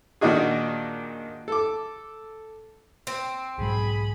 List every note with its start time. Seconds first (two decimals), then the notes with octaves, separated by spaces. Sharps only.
0.21 A#2 D#3 D4 D#4 F#4 G#4
1.48 A4 D6
3.07 C4
3.58 B1 G#2 F#3 G#4 B5